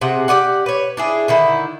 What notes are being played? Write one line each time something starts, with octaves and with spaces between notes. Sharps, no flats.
C3 G#4 F#5
G4 G#4 D5 F#5
B4 C#5
D4 E4 G#4
D3 D#3 E4